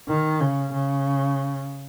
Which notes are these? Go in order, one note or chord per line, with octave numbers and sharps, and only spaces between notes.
D#3
C#3
C#3